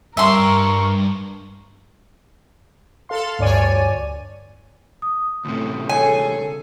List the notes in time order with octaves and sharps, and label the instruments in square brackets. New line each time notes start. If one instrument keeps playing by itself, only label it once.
[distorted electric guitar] G2 [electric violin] A#4 C#6 [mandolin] E5 C6
[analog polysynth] A4 F5 C6
D2 G2 C#5 D5 G#5 D#7
[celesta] D#6
[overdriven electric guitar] D2 C3 [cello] A2
[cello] G#4 A4 [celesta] C#5 [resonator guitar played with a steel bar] G#5